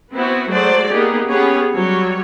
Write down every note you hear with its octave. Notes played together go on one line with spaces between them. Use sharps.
B3 C4 E4 F#4
F#3 G#3 A3 G#4 C5 D5
A#3 B3 D#4 G4 G#4
B3 C#4 G4 G#4 C#5
F#3 G3 C#5